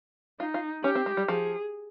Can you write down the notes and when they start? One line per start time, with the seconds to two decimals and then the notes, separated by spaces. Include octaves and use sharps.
0.40 D#4 F4
0.54 F4
0.84 C#4 G4
0.95 C4
1.06 G#3
1.17 G3
1.28 F3 G#4